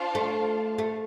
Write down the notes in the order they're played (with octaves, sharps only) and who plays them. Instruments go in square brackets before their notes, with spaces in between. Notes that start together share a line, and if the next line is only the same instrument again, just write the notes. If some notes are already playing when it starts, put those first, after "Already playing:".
Already playing: [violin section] D4 F4 C5 F5 A5
[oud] A3
A3